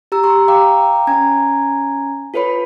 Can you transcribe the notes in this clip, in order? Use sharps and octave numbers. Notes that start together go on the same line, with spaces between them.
G4 A#5 E6
G4 A#5 C6 C#6 E6
F5 G5 A#5 D6
C#4 G#5 A#5 G#6
F4 A4 B4 C#5 B5